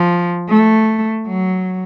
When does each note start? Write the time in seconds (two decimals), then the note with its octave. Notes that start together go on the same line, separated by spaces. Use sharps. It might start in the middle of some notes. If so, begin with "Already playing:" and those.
Already playing: F3
0.49 A3
1.27 F#3